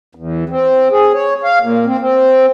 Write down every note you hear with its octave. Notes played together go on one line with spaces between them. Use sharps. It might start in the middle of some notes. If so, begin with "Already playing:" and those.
E2
C4
G#4
C#5
F5
A#2
C4
C4